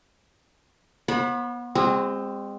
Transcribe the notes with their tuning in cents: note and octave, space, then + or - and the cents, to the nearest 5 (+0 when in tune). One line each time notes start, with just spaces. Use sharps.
B3 -30 C5 +45 B5 +0
G#3 -35 C4 +0 F#4 +0